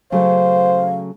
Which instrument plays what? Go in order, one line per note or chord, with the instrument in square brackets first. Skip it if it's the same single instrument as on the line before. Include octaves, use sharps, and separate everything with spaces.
[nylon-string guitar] C#3 F#3 A3 [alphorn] C5 [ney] F5